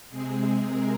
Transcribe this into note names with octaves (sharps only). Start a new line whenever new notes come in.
C3 G#3 C4 G#4
A#4